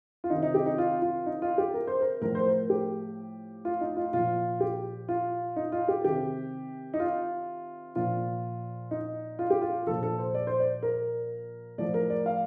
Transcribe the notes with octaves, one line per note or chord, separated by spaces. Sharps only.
F4
C3 D#3 D#4
D#4
G4
D#4
F4
F4
D#4
F4
G4
A#4
C5
A#4
A2 F3 A#4
C5
A#4
G4
F4
D#4
F4
A#2 F3 F4
G4
F4
D#4
F4
G4
C3 D#3 G4
D#4
F4
A#2 F3 F4
D#4
F4
G4
F4
A#2 F3 A4
A4
C5
D5
C5
D5
A#4
A2 F3 D5
A#4
D5
F5